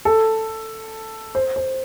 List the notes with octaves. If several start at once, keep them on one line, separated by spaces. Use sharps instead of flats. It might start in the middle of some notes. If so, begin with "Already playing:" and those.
A4
C5
C5